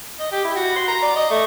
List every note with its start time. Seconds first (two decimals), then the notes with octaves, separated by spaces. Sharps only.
0.19 D#5
0.32 G4
0.44 E4
0.56 F#4
0.76 C6
0.88 A#5
1.02 D5
1.16 D#5
1.31 A3